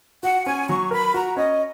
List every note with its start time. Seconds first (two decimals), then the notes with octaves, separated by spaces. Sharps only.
0.23 F#4 F#5
0.46 C#4 G#5
0.68 F#3 C#6
0.91 A#4 B5
1.14 F#4 A#5
1.37 C#4 D#5